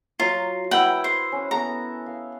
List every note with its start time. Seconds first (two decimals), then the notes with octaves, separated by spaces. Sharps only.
0.20 F#3 F4 C#5 A#5
0.71 E4 B4 F#5 G5
1.04 C5
1.32 C#4 F#5 C#6
1.51 B3 A4 A#5
2.06 F5